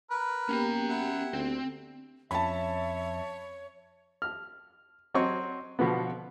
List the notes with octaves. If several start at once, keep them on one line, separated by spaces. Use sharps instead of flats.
A#4 B4
A#3 B3 C#4 G4 G5 G#5 A#5
E4 F#5
D2 C4
F2 C#4 C#5 E5 A5 B5
F6
F#3 C4 C#5 D#5 C#6
B2 D3 F3 B3